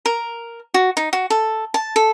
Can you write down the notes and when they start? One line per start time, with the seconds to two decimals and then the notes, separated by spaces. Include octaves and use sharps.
0.06 A#4
0.74 F#4
0.97 D#4
1.13 F#4
1.30 A4
1.74 A5
1.96 A4